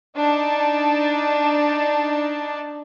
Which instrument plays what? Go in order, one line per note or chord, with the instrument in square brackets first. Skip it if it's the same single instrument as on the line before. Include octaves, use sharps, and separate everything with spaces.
[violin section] D4 D#4 A5